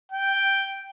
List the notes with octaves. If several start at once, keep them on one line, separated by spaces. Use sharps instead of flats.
G5